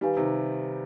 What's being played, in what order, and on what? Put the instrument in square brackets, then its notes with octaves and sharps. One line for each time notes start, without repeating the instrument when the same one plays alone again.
[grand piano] D#3 G3 [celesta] D#4 G4 B4 F5 G#5
[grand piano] C3 D#3